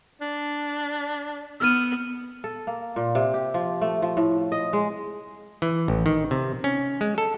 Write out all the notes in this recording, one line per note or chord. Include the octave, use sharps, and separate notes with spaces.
D4
B3 E6 F6 D#7
A4
A#3
A#2
C3
G4
F3
A3
F3
A2
D#5
G#3
E3
A1
D#3
C3
C#4
G#3
A4